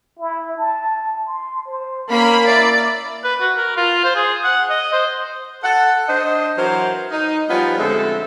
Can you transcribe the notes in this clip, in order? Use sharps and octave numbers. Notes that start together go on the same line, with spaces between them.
E4
A5
C6
C5
A#3 C#4 B5
E4 D5
B4
F#4
A#4
F4
C5
G#4
F#5
D#5
C5
A4 F#5
D4 C5 D#5
E3 F#3 A#4 C5
D#4
F3 G3 B3 C#4 D#4 F4
F2 D3 G#3 A4 C5 E5